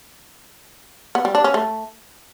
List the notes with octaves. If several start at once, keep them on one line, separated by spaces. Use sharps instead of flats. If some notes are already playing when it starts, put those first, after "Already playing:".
B3
G3
D4
C#4
A3